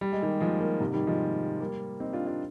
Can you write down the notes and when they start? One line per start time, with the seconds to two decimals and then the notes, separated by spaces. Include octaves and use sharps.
0.01 G3
0.12 G#3
0.22 D#3 G3
0.40 F3 G#3
0.60 G3 A#3
0.80 G#2 C3
0.93 D#3 G3
1.07 F3 G#3
1.60 G3 A#3
2.00 C4 D#4
2.13 D4 F4
2.27 D4 F4